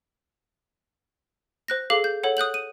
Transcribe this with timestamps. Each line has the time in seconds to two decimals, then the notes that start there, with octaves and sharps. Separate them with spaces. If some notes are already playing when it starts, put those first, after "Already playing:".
1.68 C5 F#6 A#6
1.90 G#4 A4 F5 D6
2.04 G6
2.23 A4 C#5 F#5
2.37 D#6 F#6 G6 F#7
2.54 D#7